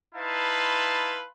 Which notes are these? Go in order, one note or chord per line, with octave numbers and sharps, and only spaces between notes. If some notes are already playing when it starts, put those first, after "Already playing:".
D#4 E4 B4 F5 A5 C6